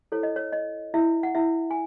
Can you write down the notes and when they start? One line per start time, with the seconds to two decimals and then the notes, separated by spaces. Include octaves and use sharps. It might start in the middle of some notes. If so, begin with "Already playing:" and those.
0.12 E4 A4 C5 C#5
0.23 D#5
0.36 C#5
0.53 D#5
0.94 E4 E5
1.23 F#5
1.35 E4 E5
1.71 G#5